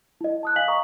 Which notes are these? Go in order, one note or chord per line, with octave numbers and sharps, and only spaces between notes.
E4 D#5
A5 D#6 F#6
D#5 F5 G#5 B6 F#7
D#5 A#5 C#6 D#6